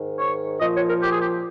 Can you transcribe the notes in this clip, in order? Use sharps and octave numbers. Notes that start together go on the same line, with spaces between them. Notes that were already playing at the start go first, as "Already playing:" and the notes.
Already playing: G#2 D#3
C#5
A#2 F3 D#5
C#5
A#4
G4
G#4
G4